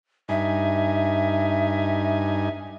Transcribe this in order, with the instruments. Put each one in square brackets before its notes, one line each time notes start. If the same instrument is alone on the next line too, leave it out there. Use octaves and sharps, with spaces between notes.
[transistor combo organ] G2 D#4 G#5 [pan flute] E5